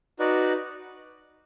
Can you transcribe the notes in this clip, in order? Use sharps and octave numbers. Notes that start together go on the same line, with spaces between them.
D#4 F#4 B4 D5